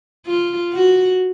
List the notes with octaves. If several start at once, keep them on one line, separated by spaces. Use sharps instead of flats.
F4
F#4